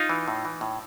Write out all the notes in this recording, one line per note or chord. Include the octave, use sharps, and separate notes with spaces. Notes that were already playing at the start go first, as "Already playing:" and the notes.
Already playing: D#4 F4
E3
A2
E3
A2